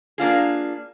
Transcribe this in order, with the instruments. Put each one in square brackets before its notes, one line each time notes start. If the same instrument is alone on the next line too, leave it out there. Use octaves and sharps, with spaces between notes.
[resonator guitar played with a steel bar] A#3 D4 F4 G#4